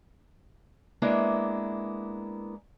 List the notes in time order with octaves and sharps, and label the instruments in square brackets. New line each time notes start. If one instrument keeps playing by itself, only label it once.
[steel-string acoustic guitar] G#3 A#3 B3 D4 E4